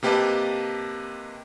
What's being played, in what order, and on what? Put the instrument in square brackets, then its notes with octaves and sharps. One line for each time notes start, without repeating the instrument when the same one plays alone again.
[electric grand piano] C3 A#3 G4 B4 D#5 A5